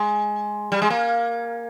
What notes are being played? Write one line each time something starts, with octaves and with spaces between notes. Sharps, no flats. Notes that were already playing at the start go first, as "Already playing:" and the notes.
Already playing: G#3
G3
G#3
A#3